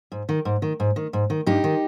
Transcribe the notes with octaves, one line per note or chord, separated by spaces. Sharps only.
G#2
D#3
G#2
D#3
G#2
D#3
G#2
D#3
G2 D#4 G4
D#3